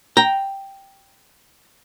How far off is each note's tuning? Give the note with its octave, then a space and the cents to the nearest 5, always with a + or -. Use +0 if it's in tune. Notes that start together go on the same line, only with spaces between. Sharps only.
G5 +0 A#5 +0